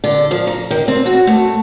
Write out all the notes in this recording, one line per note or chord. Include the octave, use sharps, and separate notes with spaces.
D3
F3
A#5
D#3
C4
F#4
A3